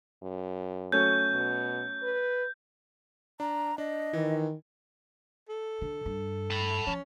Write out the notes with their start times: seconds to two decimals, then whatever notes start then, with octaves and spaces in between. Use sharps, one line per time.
0.22 F#2
0.92 F#3 A3 C#4 G6
1.32 B2
2.03 B4
3.40 D4 A#5
3.78 D4 D#5
4.13 D#3 E3
5.49 A4
5.81 D3
6.05 G2
6.51 A5 B5
6.87 F3 C#4